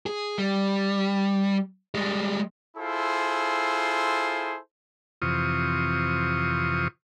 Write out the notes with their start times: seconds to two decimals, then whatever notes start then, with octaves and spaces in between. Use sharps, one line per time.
0.06 G#4
0.38 G3
1.95 G3 G#3
2.77 E4 F4 G#4 A4 C5
5.22 F2 C3 E3 F4 C#6 D#6